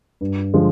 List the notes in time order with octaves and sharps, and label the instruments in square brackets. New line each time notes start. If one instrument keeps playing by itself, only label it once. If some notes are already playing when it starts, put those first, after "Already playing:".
[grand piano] G2
D3 F3 G#3